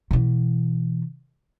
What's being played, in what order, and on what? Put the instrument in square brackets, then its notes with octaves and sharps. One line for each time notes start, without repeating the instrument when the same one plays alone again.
[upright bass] B2 E3